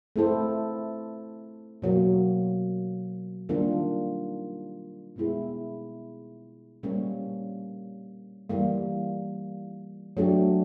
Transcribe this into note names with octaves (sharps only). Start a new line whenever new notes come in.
A3 C4 E4 A4 C5
B2 F#3 A#3
D#3 G3 A#3 D4 F4
B2 G#3 B3 E4 G#4
A#2 G3 A#3 C#4
E3 G3 A#3
F#3 A3 D4 G4